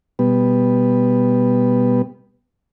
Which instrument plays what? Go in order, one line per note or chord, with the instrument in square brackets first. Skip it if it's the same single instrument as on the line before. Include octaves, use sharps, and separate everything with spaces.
[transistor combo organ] B2 G3 B3